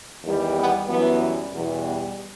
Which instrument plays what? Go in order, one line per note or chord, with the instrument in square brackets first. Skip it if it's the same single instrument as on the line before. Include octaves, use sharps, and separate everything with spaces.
[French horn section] E2 D#3 G3
B3
F#2 E3 G3 B3
E2 B2 G3
B3